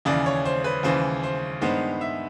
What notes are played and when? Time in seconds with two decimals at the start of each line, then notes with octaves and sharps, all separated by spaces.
0.05 D#2 C#3 E3 D5
0.26 C#5
0.45 C5
0.64 B4
0.83 D#2 C#3 E3 C5
1.23 C5
1.61 G2 D#3 G#3 B3 C5
2.01 E5